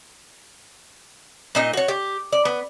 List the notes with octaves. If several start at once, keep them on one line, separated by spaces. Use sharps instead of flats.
A#2 D#4 D#5
F#4 C#5
G4
D5
B3